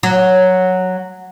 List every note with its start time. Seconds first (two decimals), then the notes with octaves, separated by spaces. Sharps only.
0.03 F#3